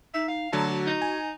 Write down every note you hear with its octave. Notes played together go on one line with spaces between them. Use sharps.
D#4 E5
F5
D3 F#3 A3 A5 A#5
F#4
D#4
G#5